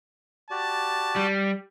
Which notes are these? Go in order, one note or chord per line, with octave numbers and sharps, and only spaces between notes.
F#4 G4 D5 A5
G3